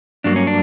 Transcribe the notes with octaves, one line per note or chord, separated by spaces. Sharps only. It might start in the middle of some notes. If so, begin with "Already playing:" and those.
G2 F#3 A#3 D4
C#4
D4